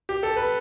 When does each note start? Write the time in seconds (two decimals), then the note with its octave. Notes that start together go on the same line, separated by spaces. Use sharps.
0.09 G4
0.23 A4
0.36 B4